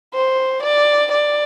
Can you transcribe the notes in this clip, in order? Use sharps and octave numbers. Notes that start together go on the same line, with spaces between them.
C5
D5
D5